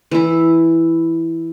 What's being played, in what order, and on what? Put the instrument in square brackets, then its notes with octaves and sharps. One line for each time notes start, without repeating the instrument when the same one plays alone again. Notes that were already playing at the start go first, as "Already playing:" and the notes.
[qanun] E3 E4